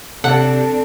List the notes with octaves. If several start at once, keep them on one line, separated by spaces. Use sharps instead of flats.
C3 C4 D4 A4 F#5